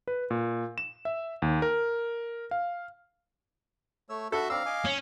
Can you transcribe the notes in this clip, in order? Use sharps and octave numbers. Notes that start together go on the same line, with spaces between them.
B4
A#2
E7
E5
D#2
A#4
F5
A3 C#5 E6
F#4 A4 E5 B5
C4 D5 F5 A#5 E6
D#5 G#5 D6
C#4